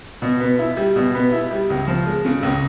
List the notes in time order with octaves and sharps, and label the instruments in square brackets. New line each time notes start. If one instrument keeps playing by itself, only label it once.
[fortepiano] B2
B3
E4
G3
B2
B3
E4
G3
C#2
F3
G#3
C#3
C#2